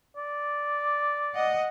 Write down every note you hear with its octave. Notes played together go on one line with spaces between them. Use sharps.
D5
D#5 F#5